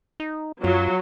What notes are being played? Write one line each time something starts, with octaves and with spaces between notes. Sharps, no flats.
D#4
F#2 F#3 F4